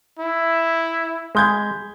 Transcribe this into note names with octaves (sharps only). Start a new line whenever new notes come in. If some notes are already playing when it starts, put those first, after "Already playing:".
E4
G#3 B5 G6 G#6